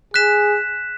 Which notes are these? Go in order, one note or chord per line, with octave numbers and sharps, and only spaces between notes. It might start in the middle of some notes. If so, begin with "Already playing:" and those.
G#4 F#6 B6 E7